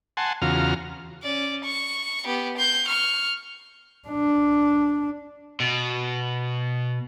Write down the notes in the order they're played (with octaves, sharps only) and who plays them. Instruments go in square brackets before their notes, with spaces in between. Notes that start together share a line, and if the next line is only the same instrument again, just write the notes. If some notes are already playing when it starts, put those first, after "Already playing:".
[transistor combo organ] F#5 G#5 A5 C6
E2 C#3 F4 F#4 A#5 F6
[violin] C#4 D5
C#6
B3 G4
C6 G6
C#6 F6
[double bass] D4
[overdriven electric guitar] B2